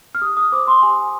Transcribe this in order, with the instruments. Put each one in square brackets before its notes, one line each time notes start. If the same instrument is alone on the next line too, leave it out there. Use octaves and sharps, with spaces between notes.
[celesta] F6
G4 D#6
D#6
C5 D6
C6
G4 G#5